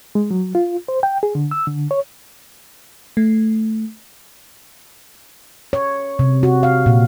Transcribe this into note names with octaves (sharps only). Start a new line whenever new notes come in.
G#3
F#3
F4
C5
G5
G#4
D3
E6
D3
C#5
A3
C#5
C3
F#4
F5
A#2